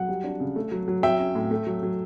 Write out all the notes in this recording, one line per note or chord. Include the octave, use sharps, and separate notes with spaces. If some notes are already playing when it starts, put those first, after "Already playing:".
Already playing: F#3 F#5
G3
D4
C#3
A3
F#3
F#3
F#3 E5 G5
C#4
A2
A3
F#3
F#3